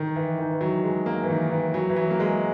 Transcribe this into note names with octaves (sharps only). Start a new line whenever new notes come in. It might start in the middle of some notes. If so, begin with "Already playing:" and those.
Already playing: D#3
E3
D#3
E3
F#3
G#3
A#3
E3
D#3
E3
F#3
E3
F#3
A#3
G#3